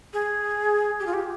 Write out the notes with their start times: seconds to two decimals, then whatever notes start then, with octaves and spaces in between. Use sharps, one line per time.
0.13 G#4
1.00 G4
1.06 F4
1.14 G4